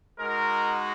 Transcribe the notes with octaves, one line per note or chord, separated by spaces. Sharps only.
G#3 D#4 F#4 A#4